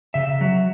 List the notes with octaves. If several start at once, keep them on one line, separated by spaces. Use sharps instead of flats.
C#3 E5
F#3